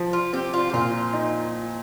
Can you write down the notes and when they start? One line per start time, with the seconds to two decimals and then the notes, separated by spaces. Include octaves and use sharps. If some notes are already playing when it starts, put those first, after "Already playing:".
Already playing: F3
0.13 F4
0.33 C4 G4
0.54 F4
0.70 G4
0.73 A#2 F4
1.13 D#4